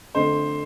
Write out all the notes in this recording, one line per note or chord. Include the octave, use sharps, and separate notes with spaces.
F2 D3 A3 C5